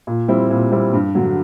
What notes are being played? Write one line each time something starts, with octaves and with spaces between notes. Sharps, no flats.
A#2
G3 C4 E4
A#2
G3 C4 E4
G2
D3 F#3